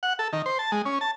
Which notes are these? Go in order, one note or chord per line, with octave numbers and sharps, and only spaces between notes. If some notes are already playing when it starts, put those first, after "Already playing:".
F#5
A4
D#3
C5
A5
G#3
C#4
A5